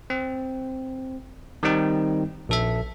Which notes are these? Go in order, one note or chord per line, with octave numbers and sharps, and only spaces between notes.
C4
D#3 G3 C4 D#4
A#1 A4 E5